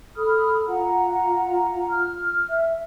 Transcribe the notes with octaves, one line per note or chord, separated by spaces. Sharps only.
A4 B5 D#6 F6
F4 F#5 A#5
F6
E5